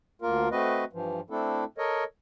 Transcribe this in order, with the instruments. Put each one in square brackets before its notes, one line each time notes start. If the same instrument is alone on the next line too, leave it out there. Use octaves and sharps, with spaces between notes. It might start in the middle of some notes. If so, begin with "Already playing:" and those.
[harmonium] D2 A#3 F4 A#4
A3 C4 F#4 B4 D#5
G2 E3 F3
A3 C4 D4 E4 A4
A4 A#4 C#5 D#5